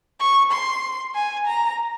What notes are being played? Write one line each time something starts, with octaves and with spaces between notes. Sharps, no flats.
C#6
C6
G#5
A#5